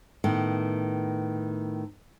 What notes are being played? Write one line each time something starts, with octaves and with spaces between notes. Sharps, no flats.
A2 D#3 B3